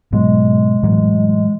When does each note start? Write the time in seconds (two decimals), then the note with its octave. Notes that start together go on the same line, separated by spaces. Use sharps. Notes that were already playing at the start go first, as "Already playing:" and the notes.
0.12 G#2 B2 F#3 G#3
0.83 A2 E3 F#3